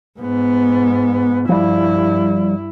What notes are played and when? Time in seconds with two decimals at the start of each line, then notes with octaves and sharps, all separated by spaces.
0.19 G#2 B3
1.49 G2 F3 G3 E4